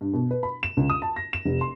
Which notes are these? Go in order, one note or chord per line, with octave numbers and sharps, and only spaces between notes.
G2
B2
B4
B5
E7
C#2
D#6
A5
A#6
E7
F1
C6